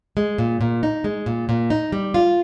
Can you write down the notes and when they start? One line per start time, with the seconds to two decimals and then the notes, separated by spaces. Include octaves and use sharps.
0.17 G#3
0.38 A#2
0.61 A#2
0.83 D#4
1.04 G#3
1.26 A#2
1.49 A#2
1.70 D#4
1.92 G3
2.14 F4